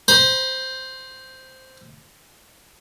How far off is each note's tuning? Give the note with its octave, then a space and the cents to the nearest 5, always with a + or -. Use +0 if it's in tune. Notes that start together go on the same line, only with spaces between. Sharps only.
C5 +0 B5 -45